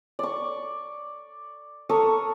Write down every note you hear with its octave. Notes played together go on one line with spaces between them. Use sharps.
D5 C#6
A4 A#4 C#6 D#6